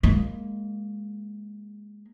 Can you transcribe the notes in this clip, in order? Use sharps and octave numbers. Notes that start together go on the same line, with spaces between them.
G#3 A#3